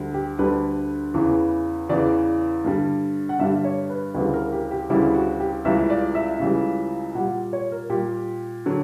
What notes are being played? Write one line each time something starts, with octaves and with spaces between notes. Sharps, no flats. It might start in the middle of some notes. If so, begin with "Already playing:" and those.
Already playing: D2 D3 G3
G4
D2 D3 G3 B4
E2 C#3 E3
E2 C#3 E3 D5
G2 D3 G3
F#5
G2 D3 G3 E5
C#5
B4
D2 C#3 E3 G3 B4
A#4
G4
G4
D2 C#3 E3 G3 E4
F#4
G4
C#2 C#3 E3 G3 E5
D5
E5
C#2 C#3 E3 G3
A#2 G3 F#5
C#5
A#4
A#2 G3 G4
D3 F#3